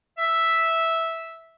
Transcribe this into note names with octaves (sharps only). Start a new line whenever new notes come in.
E5